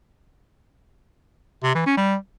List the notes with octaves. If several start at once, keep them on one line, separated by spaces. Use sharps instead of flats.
C3
E3
C#4
G3